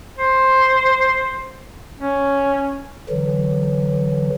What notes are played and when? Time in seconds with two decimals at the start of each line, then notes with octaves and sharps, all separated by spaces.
0.18 C5
1.99 C#4
3.09 D3 E3 F#3